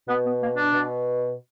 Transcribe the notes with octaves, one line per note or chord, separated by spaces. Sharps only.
B2 B3
B3
A#3
D4
B2